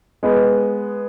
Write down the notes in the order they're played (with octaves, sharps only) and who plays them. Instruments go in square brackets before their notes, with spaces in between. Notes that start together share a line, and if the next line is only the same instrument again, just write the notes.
[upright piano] G#3 B3